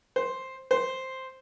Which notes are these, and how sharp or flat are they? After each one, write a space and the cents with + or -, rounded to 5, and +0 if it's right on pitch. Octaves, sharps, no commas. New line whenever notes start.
C5 +5
C5 +0